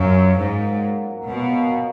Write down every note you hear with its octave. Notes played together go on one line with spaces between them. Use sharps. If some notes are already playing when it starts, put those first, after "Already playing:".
Already playing: F#2 F3 A#3 C#4
A#2
A#2
G#2 F#3
A#3
F#3
A#3
F#3
F#3
B2 F3
A#3
A#3
A#3